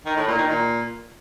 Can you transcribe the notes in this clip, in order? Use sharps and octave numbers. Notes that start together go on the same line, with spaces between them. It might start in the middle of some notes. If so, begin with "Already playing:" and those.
D#3
A2
A#2
D#3
A#2